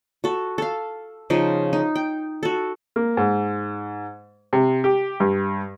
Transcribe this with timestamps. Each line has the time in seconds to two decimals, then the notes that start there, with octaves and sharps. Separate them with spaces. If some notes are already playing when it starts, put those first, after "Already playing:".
0.24 F#4 A4
0.58 A4 F5
1.30 C#3 F3 D#4 D#5
1.73 D#4
1.95 G5
2.43 F#4 A4
2.96 A#3
3.17 G#2
4.53 C3
4.84 G4
5.20 G2